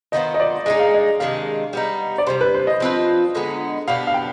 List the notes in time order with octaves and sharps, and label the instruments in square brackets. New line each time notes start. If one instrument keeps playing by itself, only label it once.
[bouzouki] D#3 B3 F4 C5 [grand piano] D#5
[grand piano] D#5
D5
[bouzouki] G#3 B3 D#4 G#4 [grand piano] D#5
[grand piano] F5
D#5
[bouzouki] C3 D#3 G#3 D4 [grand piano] F5
[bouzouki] G3 B3 D#4
[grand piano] D5
[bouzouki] C3 D#3 G3 [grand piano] C5
[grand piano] B4
C5
D#5
[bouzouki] F3 C4 F4 B4
D3 G#3 B3 D#4
[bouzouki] B2 B3 D4 G4 [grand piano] F5
[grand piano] F5
G5